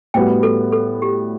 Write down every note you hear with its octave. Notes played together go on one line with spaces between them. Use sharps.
A2 G3 B3 F#4 G5
A4
A4
G4